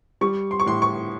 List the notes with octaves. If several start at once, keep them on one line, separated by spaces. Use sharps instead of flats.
G3 C#6
C6
C#6
A2 C6
C#6